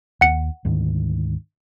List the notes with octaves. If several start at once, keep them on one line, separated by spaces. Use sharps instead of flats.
D#2 F#5 C#7
D2 G#2 D#3